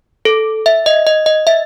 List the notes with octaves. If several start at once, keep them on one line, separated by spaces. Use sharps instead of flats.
A4
E5
D#5
D#5
D#5
E5